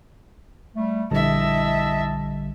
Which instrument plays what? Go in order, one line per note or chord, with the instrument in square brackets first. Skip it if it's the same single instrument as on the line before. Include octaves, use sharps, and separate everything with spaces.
[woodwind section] G3 A3
[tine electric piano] A#1 D3 G3 [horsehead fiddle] E4 E5 [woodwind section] D#5 A5